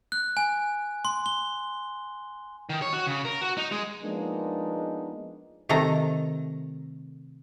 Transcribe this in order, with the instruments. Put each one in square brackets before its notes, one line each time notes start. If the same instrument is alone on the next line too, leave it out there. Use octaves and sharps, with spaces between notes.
[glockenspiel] F#6
G#5
C6
G7
[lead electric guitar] D#3
C#5
F#4
C#3
A#4
F#4
D#4
G#3
[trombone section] F3 G#3 A#3 B3 D4 D#4
[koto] C3 D#3 A3 A4 A#5